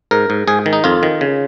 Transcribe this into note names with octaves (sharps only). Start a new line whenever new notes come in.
G#2 A#4
G#2
G#2 G#4
D#3
D#4
F2 F4
D#3
C#3